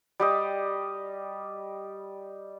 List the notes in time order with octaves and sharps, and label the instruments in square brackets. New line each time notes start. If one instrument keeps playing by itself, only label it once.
[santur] G3 G4 D#5